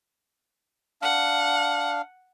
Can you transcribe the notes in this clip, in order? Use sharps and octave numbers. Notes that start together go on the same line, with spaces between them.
D4 F5 F#5